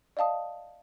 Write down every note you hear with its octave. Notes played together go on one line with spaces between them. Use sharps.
D5 D#5 F5 A5 D#6